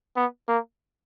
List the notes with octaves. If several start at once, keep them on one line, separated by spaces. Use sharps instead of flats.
B3
A#3